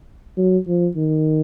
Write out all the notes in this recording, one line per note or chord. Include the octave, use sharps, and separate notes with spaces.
F#3
F3
D#3